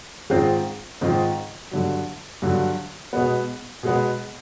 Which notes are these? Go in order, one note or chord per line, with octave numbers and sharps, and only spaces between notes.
G#2 D#3 G#3 C4 F4
G#2 D#3 G#3 C4 F4
G2 D3 F#3
G2 D3 F#3
B2 G#3 B3
B2 G#3 B3